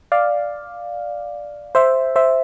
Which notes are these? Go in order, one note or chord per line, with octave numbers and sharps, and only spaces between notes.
D5 F5
C5 E5
C5 E5